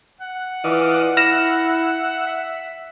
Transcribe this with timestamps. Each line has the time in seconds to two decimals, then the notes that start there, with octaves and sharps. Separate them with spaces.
0.21 F#5
0.64 E3 F4 D5 D#5
1.17 E4 E5 F6 A#6 E7
2.27 E5